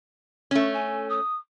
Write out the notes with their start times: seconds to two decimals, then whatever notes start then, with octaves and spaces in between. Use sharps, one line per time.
0.51 A3 C#4
0.73 G#5
1.09 D#6